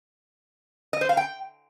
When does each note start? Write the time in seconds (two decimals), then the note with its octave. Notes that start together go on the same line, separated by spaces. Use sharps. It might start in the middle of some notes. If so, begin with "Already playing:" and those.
0.93 D#5
1.01 C5
1.09 F5
1.17 G5